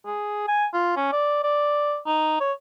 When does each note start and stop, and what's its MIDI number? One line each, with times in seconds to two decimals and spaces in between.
0.06 0.46 68
0.48 0.66 80
0.73 0.94 65
0.96 1.09 61
1.12 1.43 74
1.44 1.98 74
2.06 2.37 63
2.40 2.52 73